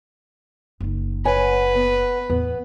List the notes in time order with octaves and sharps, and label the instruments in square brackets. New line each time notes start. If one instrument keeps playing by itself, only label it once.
[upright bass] F#1 D#4
[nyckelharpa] B4 [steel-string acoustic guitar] C#5 F#5 G#5
[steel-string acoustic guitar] B3
[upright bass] E2 A2 [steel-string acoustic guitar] B3